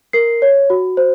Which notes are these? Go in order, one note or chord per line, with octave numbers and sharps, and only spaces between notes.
A#4 C7
C#5
F#4
C5